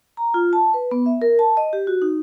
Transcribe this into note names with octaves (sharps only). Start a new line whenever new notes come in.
A#5
F4
A5
B4
B3
E5
A#4
A5
D#5
G4
F#4
D#4